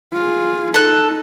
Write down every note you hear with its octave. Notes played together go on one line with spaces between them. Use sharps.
F4 G#4
D#4 A4 F#6